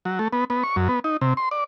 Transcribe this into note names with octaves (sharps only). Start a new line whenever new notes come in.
F#3
A3
B3
B3
C#6
F#2
B3
D#4
C3
C6
D5